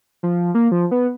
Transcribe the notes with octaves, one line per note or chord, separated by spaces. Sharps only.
F3
A#3
F3
B3